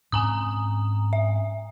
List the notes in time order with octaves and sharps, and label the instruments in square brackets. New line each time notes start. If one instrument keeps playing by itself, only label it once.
[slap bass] G#2 C4 C#4 [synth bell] G#5 A#5 D#6
[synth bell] E5